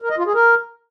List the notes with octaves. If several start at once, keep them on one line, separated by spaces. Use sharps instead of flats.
A#4
D#5
F4
G#4
A#4